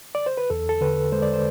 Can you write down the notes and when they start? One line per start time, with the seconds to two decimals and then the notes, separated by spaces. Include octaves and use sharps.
0.15 D5
0.26 C5
0.38 B4
0.50 E2 A4
0.69 A4
0.81 D3 B4
1.12 G#3 C5
1.22 D5
1.33 C5